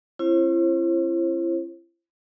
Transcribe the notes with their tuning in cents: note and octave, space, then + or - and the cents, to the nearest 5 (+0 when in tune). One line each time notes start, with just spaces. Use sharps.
C#4 -45 E4 +45 C5 +35